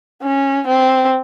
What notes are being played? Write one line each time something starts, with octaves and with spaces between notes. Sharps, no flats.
C#4
C4